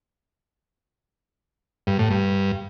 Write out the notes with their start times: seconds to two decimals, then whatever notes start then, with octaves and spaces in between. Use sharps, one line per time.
1.87 G2
1.99 A2
2.11 G2